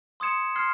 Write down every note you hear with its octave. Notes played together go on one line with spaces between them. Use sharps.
C6 D#6 G#6 C#7 E7
C6 F6 G#6 C7